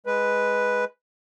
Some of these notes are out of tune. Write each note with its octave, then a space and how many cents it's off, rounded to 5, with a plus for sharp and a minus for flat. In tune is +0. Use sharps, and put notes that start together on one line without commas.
G#3 +0 B4 +0